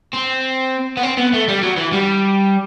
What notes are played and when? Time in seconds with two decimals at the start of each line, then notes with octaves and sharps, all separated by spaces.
0.14 C4
0.97 B3
1.03 C4
1.18 B3
1.33 A3
1.48 G3
1.63 F#3
1.77 E3
1.93 G3